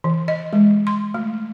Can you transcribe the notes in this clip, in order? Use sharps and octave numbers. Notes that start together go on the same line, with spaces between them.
E3
D#5
G#3
C6
A3